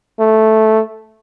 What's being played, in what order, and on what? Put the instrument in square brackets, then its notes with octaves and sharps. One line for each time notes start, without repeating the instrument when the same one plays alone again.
[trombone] A3